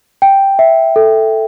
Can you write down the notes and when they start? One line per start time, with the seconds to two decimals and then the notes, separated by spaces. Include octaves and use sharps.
0.22 G5
0.59 E5
0.96 A4